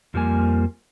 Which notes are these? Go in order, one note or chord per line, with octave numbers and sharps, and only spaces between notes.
F2 F3 G3 A#3 G#5